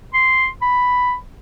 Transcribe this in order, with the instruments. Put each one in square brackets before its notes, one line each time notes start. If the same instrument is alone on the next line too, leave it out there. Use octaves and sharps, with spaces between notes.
[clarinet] C6
B5